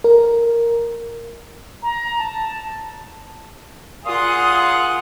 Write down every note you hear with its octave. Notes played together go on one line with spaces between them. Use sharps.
A#4
A#5
A5
A#2 F4 G#4 F#5 C6 D#6